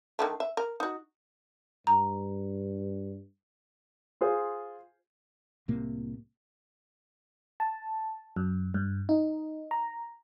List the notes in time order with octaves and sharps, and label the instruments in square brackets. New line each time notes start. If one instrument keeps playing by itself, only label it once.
[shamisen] D3 D#3 A3
E5
A#4
D#4 F#4
[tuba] G2 [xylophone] A#5
[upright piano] F4 G#4 C5
[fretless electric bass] C2 A2 C3 A#3
[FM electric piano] A5
F#2
G2
D#4
A#5